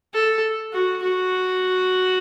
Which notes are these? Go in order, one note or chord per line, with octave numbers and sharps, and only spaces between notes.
A4
F#4
F#4